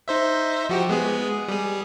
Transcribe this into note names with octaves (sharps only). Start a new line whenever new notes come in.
D#4 C5 E5
F3 F#4 G4
G#3 B3 G#4
G3 G#4